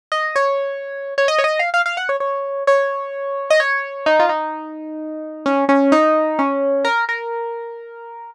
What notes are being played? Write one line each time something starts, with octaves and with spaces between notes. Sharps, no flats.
D#5
C#5
C#5
D#5
C#5
D#5
F5
F5
F5
F#5
C#5
C#5
C#5
D#5
C#5
D#4
F4
D#4
C#4
C#4
D#4
C#4
A#4
A#4